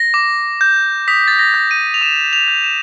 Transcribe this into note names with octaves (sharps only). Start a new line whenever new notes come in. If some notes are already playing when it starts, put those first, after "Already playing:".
Already playing: A#6
D6
G6
D#6 B6
A6
A#6
G6
D#7
F7
D#6 E7
F7
G6
E7